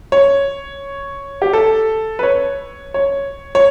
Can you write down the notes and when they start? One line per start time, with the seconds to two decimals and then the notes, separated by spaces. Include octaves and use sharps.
0.12 C#5
1.42 G4
1.53 A4
2.19 B4
2.23 C#5
2.94 C#5
3.55 C#5